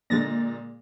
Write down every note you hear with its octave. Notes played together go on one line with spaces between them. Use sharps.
A#2 D3 G#3 A6 A#6